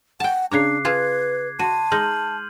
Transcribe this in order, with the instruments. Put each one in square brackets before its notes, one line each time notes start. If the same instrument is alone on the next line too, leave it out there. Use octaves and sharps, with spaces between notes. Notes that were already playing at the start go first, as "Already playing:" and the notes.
[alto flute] F#5 [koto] G5 A5
[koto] C#3 C#5 A#5 [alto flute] D4 [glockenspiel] D6 F#6 C7
[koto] F4 G#4 A5 [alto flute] B4 [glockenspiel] G#6
[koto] F#4 [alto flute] A5 [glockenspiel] C6 D#7
[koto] G#3 D#4 [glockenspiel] F6 G6 F#7